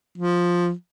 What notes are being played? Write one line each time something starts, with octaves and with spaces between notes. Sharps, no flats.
F3